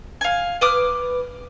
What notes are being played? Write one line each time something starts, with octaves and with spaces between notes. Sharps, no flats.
F5 G#5
B4 D6 D#6 F6